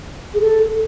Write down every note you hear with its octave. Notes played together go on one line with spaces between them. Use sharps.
G#4
A4